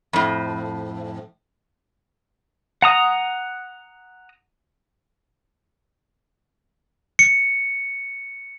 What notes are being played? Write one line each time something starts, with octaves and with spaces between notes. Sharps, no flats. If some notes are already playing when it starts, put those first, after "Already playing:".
F2 A2
F#5 A#5 D#6
C#7